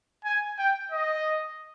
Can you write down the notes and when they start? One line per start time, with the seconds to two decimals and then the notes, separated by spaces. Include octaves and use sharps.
0.24 G#5
0.58 G5
0.92 D#5